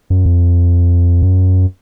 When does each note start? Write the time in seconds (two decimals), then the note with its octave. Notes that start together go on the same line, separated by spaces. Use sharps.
0.10 F#2
0.26 F2
1.22 F#2